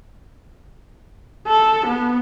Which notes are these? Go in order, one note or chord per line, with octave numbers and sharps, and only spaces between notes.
A4
B3